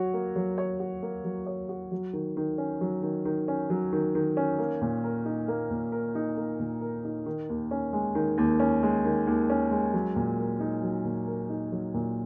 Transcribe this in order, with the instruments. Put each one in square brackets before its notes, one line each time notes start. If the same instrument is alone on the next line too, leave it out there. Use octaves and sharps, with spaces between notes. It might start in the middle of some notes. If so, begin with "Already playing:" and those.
Already playing: [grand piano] F#3 F#4 C#5
A#3
F#3
C#5
F#4
A#3
F#3
C#5
F#4
F#3
D#3
D#3
C#4
F#3
D#3
D#3
C#4
F#3
D#3
D#3
C#4
A#3
A#2
A#4
D#4
A#3
A#2
A#4
D#4
A#3
A#2
A#4
D#4
D#3
D#2
C#4
G#3
D#3
D#2
C#4
G#3
D#3
D#2
C#4
G#3
F#3
A#2
A#4
D#4
F#3
A#2
A#4
D#4
F#3
A#2